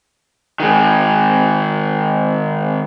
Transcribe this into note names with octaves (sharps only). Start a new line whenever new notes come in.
D#3 G#3